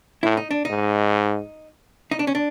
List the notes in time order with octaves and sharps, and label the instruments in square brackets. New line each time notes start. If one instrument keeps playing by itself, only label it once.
[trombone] A2 [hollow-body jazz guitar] E4
[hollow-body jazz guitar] D#4
D4
[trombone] G#2 [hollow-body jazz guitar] D#4
[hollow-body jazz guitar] D#4
D4
C#4
D4